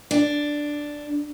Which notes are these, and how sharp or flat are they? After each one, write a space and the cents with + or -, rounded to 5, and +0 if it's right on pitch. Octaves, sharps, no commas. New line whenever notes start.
D4 +0